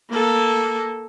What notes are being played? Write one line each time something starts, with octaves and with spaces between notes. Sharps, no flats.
A#3 A4